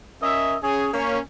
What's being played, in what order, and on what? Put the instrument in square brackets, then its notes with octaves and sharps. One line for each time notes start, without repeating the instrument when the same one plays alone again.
[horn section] C#4 A#4 D#5 E5
C#4 G#4
A#3 C#4